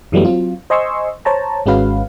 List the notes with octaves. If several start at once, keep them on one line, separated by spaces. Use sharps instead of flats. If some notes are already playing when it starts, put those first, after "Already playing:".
F#2 E3 F#3 G3 A3 B3
F#3 C4 F4
C5 D#5 G#5 C6 C#6 E6
C5 C#5 A5 A#5
G#1 G#3 C#4 F#4 B4 F5